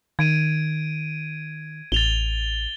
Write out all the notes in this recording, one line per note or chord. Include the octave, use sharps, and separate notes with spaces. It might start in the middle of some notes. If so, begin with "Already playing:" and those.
D#3 G#6 D7 D#7
A1 A6 F7 G7